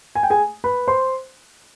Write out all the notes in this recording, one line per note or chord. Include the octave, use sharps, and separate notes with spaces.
G#5
G5
G#4 G#5
B4 B5
C5 C6